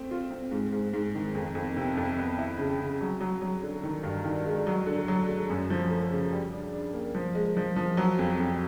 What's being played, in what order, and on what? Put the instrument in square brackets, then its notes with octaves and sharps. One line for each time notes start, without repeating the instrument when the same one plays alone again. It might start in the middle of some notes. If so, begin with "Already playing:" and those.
Already playing: [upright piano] A3 C4
F4
C4
G#2
G#2
G#2
D#3
F2
F2
C3
F2
B3
E4
C#3
C#3
F#3
F#3
F#3
D3
D#3
G2
D#3
G#3
F#3
D3
F#3
A3
F#2
F3
A3
C#3
G3
D4
D4
A#3
F3
G#3
F3
F3
F#3
F2
F2